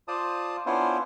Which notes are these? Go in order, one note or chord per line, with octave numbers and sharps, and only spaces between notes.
F4 C5 D5 A5 D#6
B3 C#4 D4 E4 F4 C5